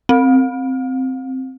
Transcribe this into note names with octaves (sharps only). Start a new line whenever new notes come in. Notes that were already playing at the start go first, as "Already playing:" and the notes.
C4